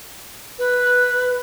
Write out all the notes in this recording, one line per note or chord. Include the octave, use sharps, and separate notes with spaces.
B4